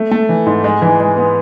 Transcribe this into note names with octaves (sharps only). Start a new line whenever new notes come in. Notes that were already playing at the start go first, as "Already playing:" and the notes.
Already playing: A3
A3
E3
G#2
G#3
E3
G#3
B3